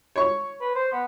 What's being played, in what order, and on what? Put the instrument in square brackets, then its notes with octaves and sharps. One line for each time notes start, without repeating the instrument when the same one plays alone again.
[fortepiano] C#5 C#6
[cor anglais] B4
C5
B3